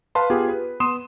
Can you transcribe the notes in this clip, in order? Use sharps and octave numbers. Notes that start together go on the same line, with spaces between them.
B4 F5 A5 C6
B3 F4 G4 G#4
B4
B3 C6 D#6 E7